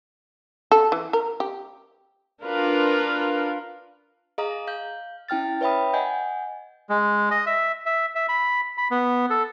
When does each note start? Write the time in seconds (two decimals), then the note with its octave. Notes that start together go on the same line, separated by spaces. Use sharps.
0.72 A4
0.92 E3
1.13 A#4
1.40 G4
2.42 D4 F4 A#4 B4 F5
4.38 G#4 D#5 F5 A#5 D#6
4.67 F5 G6
5.29 C#4 E4 G5 F6 A6
5.61 B4 C#5 E5 G5 B5 D#6
5.94 D#5 F#5 G#5 G6
6.89 G#3
7.31 D#5
7.47 E5
7.86 E5
8.15 E5
8.29 B5
8.78 B5
8.91 B3
9.30 A4